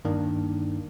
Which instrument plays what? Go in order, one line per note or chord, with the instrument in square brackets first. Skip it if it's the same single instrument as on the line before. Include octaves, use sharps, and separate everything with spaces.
[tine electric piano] G2 D#3 A#3 D4